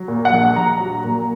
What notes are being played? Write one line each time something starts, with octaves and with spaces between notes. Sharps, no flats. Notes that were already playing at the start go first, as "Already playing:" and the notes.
Already playing: F#3
A#2
F#5
A#1
A#1 A#5
F#3
A#2